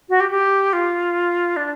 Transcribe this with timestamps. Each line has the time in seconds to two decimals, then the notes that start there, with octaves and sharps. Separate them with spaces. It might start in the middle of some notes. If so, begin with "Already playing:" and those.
0.09 F#4
0.20 G4
0.31 G4
0.73 F4
1.56 D4